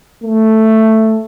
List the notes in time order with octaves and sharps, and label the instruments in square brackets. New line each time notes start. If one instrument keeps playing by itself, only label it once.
[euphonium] A3